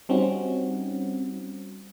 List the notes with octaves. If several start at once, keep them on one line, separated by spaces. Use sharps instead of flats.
G3 C4 C#4 D#4 F#4